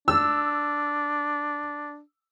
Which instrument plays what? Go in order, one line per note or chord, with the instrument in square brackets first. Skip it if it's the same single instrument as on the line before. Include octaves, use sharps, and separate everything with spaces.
[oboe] D4 [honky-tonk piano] E6